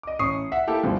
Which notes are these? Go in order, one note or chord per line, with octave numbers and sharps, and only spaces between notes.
D#5 D6
A1 C#4 C#6 D#6 C7
E5 F#5
A#3 E4 G4 A4
D2 G2 B2 F3